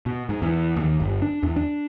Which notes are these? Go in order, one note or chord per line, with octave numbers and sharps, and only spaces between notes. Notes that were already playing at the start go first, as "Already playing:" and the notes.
B2
G#2
E2
D#2
G1
D4
E2
D4